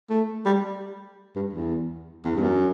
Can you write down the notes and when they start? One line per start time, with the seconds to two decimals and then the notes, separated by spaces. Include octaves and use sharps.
0.10 A3
0.46 G3
1.36 G2
1.53 E2
2.25 E2
2.35 G2
2.42 F#2